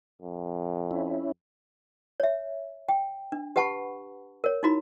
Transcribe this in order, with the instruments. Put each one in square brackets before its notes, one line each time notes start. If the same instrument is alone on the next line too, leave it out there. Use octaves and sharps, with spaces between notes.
[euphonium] F2
[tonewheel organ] C#4 E4
[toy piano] C#5 E5
G5
D4
G4 B4 F#5 A5 B5 C#6
A#4 C#5
D#4 E4 F#4 A#5 B5